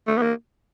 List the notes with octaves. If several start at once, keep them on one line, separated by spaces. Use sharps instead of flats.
A3
B3
A#3